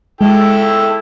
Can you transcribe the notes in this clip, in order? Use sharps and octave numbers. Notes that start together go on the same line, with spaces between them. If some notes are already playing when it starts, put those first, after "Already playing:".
G#3 E4 A4 G5